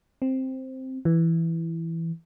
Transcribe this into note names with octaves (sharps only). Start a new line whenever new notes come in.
C4
E3